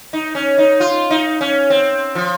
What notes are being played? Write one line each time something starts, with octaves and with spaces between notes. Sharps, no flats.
D#4
C#4
D#4
F4
D#4
C#4
C4
F3